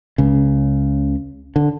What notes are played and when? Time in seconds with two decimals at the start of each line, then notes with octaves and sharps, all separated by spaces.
0.18 C#2 C#3
1.56 D3